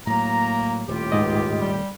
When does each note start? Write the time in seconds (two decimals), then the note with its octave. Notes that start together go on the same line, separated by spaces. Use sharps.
0.07 A2 F#3 A#3 A#5
0.88 D#1 A2 A3 F4 G4
1.12 C#2 G#2 D#5
1.61 G3